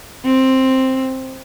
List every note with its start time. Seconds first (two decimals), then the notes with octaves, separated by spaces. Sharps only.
0.25 C4